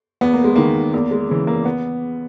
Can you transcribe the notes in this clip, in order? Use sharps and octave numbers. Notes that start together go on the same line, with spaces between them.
E2 B3
A#3
G#3
D#3 A#3
E2 A#3
G#3
C#3 E3
A#3
B3